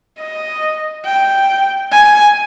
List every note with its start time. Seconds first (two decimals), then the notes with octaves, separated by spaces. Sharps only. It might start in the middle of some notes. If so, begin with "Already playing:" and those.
0.19 D#5
1.05 G5
1.92 G#5